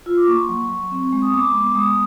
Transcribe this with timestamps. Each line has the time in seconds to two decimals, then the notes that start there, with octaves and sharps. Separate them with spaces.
0.06 F4 E6
0.17 D6
0.27 A#3 C#6
0.39 C6
0.49 F#3 C#6
0.69 F#3
0.91 C4
1.12 G#3
1.22 D#6
1.33 B3 D6
1.54 B3
1.75 G#3 D#6